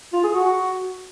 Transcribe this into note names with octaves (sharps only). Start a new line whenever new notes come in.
F4
G#4
F#4